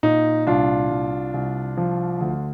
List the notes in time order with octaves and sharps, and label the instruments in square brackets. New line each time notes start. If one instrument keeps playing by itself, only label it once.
[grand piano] A#2 D#4
C2 D4 F4
C2
C2
F3
D2